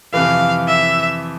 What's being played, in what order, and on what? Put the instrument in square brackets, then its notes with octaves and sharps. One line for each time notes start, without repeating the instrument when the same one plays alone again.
[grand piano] F2 C3 E3 [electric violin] F5
[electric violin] E5